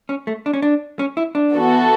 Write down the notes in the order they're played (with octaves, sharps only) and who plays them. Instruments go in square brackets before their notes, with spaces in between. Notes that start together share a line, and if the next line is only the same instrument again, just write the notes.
[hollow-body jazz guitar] C#4
A3
D4
C#4
D4
C#4
E4
D4
[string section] E3 B3 F#4 A4